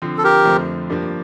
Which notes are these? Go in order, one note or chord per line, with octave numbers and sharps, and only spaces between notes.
D3 F3 C4
A4
G4 A#4
F2 D3 F3 A3 C4
G2 F3 A#3 D4 G4